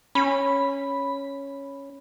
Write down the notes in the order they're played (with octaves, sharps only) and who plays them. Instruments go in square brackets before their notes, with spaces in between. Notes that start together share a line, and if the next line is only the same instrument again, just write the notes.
[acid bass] C#4 [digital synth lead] B5